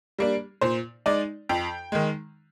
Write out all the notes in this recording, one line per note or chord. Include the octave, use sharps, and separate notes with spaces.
G3 A#3 D4
A#2 C5
G#3 D#4 D5
F2 G5
D#3 G#3